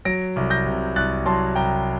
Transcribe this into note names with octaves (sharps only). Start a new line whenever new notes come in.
F#3 A#6 D7
C2
G6 A#6
C3
C2 F#6 A6
F#3 A5 C6
C2 G5 A#5